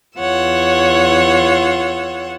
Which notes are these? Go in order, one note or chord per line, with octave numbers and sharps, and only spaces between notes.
E2 F4 C#5 F#5 E6